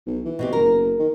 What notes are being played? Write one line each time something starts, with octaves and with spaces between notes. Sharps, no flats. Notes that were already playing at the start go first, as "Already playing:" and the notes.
B1
E3
B2 C4 G4
F#1 A#4
D#3